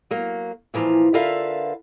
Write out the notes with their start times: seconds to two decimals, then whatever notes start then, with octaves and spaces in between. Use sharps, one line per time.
0.11 F#3 A#3
0.74 A#2 E3 F3 A#5
1.14 D3 F4 A#4 B4 E5 F5